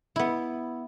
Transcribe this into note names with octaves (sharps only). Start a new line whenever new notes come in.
B3 E4